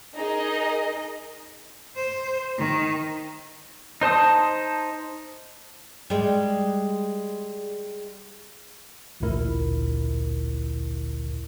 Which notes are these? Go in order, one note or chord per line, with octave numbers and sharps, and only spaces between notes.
D#4 G#4 A#4 D#5
C5
D#3
D#4 C5 A5 D#6
G3 G#3
A1 D2 A#2 D3 E4 A#4